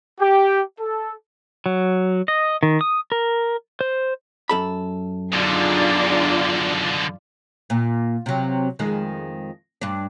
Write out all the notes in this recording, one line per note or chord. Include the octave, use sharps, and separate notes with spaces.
G4
A4
F#3
D#5
D#3
D#6
A#4
C5
F#2 A4 B5
B2 D3 D4 D#4 F4 G#4 D5
A#2
C3 F#3
F2 D#3 G#3
G2 D4